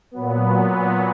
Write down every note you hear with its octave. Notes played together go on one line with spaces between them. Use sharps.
A#2 F#3 B3